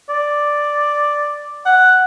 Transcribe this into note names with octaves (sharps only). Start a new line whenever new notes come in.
D5
F#5